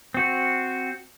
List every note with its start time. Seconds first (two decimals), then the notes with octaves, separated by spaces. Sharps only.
0.14 C4 F#4